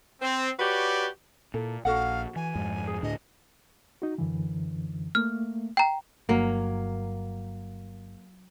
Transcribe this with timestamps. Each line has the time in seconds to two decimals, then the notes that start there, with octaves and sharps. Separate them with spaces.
0.21 C4
0.59 F#4 G4 B4 C#5 D5
1.54 A#2 E4 A4
1.85 A#1 F#4 A4 F5 F#5
2.36 E3 G#5
2.55 F2 G#2
2.87 G#4
3.03 D2 A2 D4 D#5
4.02 D#4 F#4
4.18 F#2 D3 E3
5.15 A3 A#3 F6
5.77 G5 A#5
6.29 G1 G2 F#3 A#3